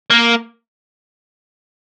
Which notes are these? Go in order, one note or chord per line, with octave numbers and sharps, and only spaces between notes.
A#3